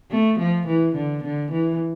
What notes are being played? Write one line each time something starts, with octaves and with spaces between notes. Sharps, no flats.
A3
F3
E3
D3
D3
E3